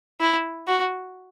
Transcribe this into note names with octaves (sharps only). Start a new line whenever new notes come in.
E4
F#4